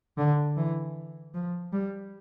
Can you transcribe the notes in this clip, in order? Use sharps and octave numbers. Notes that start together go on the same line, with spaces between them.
D3
E3
F3
G3